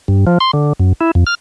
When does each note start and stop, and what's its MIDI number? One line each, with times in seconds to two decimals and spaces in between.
0.08 0.25 43
0.27 0.38 53
0.40 0.51 84
0.53 0.73 50
0.80 0.93 42
1.01 1.11 64
1.15 1.24 41
1.27 1.35 89